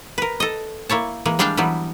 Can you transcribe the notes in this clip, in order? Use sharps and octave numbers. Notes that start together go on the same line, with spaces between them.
A#4 B4
A4 D#5
A#3 E4 C#5 A5
E3 G#3 A#3
G3 G#3 D4 F5 G5 A5
E3 F#3 G3 B3